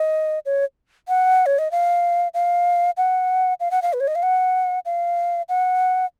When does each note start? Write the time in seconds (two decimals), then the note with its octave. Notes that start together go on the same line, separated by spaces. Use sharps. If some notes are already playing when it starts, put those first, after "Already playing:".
Already playing: D#5
0.46 C#5
1.08 F#5
1.46 C#5
1.59 D#5
1.72 F5
2.34 F5
2.97 F#5
3.60 F5
3.71 F#5
3.82 F5
3.93 B4
4.00 C#5
4.08 D#5
4.15 F5
4.23 F#5
4.85 F5
5.49 F#5